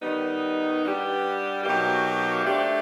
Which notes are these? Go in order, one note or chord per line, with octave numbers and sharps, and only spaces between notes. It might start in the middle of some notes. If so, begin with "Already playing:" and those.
D#3 G3 B3 D#4
G3 B3 D4 G4
B2 F#3 A#3 D#4 G4
A3 D4 G4 C5